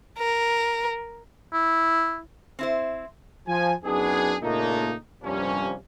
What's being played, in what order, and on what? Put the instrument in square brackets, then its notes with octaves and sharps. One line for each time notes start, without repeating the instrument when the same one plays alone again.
[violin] A#4
[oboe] E4
[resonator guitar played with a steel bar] C4 E4 C5
[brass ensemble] F3 G#5
F#2 B3 D4 D#4 G#4
A#2 C#3 A3 A#3 D4 D#4
G2 C3 F3 G3 A#3 C#4